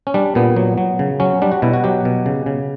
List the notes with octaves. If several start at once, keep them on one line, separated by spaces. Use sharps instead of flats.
C#4
G3 D4
A#2 B3
F#3
F#3
C#3
F#3 C#4
G3 D4
F#4
B2 E4
F#4
F#3 G4
B2
C#3
C#3